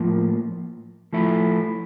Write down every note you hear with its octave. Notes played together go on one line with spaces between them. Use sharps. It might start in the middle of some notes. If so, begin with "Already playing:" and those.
Already playing: A2 F3 A#3
F3 A3 E4